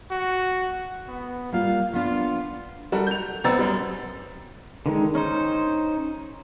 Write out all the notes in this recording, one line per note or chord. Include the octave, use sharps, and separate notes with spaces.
F#4
B3
G3 A#3 F4 F5
B3 D4 F4
G3 F#4 A4 A#4
G6 F7
F#1 B3 C4 A#5 E6 A6
F#2 G3
D3 D#3 G#3
C#4 D#4 C5